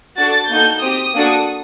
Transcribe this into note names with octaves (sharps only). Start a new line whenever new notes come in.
D4 F#4 A4 A6
A#3 D#4 F#4 A4 G6
C4 G4 D#6
A#3 D4 F#4 A4